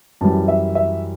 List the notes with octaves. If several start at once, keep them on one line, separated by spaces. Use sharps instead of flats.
F#2 E3 G3 A5
E5
E5